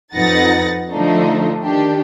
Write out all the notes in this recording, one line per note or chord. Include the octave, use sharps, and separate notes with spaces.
F2 D#4 B4 F#5 A6 A#6
D3 F3 A3 D4 D#4
D#3 D4 G4